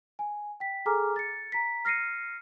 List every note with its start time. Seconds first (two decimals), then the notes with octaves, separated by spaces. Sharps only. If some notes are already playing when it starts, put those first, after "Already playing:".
0.19 G#5
0.60 G5 B6
0.86 G#4 A4 G#5 A#5 D6 F6
1.16 A6 C#7
1.52 A#5 B6
1.85 F6 A#6 C7 C#7 D#7